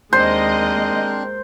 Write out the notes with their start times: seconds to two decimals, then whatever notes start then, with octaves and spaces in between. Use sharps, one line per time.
0.13 D#2 G#3 C4 D4 A#4 C5 D#5